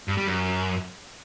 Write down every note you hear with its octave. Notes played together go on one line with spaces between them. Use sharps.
G2
G3
F#2